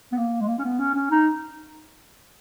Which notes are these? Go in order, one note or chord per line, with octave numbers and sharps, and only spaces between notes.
B3
A#3
G#3
A#3
C#4
B3
C#4
C#4
D#4